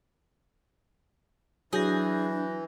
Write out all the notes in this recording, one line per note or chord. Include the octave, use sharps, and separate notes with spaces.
E3 F#3 D4 G#4 G6 A#6